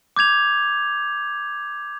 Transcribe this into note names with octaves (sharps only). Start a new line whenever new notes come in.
D6 G6 G#6 F7